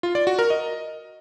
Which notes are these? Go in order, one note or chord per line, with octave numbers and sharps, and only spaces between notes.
F4
D5
F#4
A#4
D#5